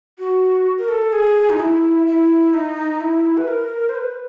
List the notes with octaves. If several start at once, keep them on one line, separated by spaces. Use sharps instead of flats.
F#4
A#4
A4
G#4
D#4
E4
E4
D#4
E4
B4
A#4
C5
B4